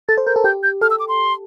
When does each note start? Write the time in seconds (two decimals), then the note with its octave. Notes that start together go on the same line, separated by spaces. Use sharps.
0.09 A4 A6
0.18 C5
0.27 A#4 G6
0.36 A4
0.44 G4 G6
0.63 G6
0.81 A4 F6
0.90 E6
1.00 D6
1.09 C6